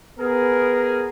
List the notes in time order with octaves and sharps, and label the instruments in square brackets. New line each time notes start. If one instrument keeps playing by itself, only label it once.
[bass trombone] B3 [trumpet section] G#4 A#4